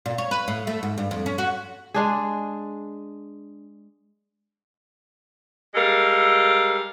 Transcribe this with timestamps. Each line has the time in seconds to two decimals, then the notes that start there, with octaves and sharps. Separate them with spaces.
0.06 A#2
0.18 C#5
0.31 B4
0.48 A2
0.67 A3
0.83 G#2
0.98 G2
1.11 F2
1.26 C#4
1.38 F#4
1.94 G#3 D4 G#4
5.75 G3 G#3 A4 A#4 F5